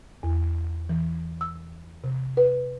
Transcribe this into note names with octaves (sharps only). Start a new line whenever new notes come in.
E2
E3
E6
C3
B4